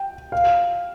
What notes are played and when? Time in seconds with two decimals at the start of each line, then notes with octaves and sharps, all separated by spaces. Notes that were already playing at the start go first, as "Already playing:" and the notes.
Already playing: G5
0.32 F5